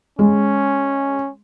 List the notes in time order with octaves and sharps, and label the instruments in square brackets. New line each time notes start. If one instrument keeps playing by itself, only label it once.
[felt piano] G#3 [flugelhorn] C#4